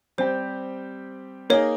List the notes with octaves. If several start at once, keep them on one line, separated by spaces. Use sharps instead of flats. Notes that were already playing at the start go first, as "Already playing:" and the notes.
G3 C4 G4 C5
A#3 D#4 G#4 C#5 D#5